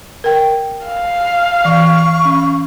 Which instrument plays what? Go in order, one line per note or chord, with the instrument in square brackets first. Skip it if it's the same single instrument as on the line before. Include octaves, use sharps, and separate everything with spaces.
[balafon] A#4 G5
[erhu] F5
[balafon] E3 [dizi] C#6
[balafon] C#4